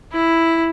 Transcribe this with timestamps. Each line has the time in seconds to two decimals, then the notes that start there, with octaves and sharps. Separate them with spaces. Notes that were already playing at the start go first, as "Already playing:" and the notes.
0.12 E4